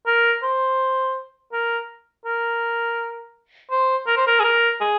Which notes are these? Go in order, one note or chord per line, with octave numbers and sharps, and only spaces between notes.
A#4
C5
A#4
A#4
C5
A#4
C5
A#4
G#4
A#4
G#4